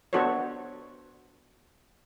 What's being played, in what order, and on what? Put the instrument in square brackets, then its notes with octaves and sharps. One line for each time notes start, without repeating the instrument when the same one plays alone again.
[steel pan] B3 D4 F#4 A4 C5 C#5